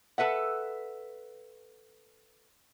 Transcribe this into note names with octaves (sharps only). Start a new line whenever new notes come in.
A4 B4 E5 F#5